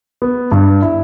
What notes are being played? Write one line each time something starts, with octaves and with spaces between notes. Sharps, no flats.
B3
G2
E4